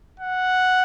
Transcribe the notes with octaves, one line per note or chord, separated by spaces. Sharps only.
F#5